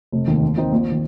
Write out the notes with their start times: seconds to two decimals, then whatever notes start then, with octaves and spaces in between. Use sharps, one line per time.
0.12 F1
0.27 D#2 D#3
0.43 D#2
0.57 D#3 C4 D#4
0.72 A#1
0.92 D#3